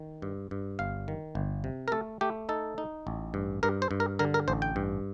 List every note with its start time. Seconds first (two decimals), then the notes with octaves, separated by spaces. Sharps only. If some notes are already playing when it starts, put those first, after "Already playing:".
Already playing: D#3
0.22 G2
0.51 G2
0.79 G1 F5
1.08 D#3
1.35 G1
1.64 C3
1.88 A#4
1.92 A3 A4
2.21 A3 G4
2.49 D#4 A4
2.78 D#4
3.07 A1
3.34 G2
3.63 G2 A#4
3.82 C5
3.91 G2
4.00 A#4
4.19 D3 A#4
4.34 A#4
4.48 A1 C5
4.62 G5
4.76 G2